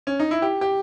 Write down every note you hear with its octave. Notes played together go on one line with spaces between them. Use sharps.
C#4
D#4
E4
G4
G4